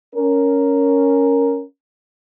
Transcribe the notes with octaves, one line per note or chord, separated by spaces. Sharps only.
C#4 A#4